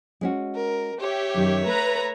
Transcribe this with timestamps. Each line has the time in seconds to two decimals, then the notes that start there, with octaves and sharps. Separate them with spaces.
0.21 G#3 C#4 F#4
0.55 A#4
1.00 G4 C#5 E5
1.34 F#2 D#3
1.66 A3 B4 A#5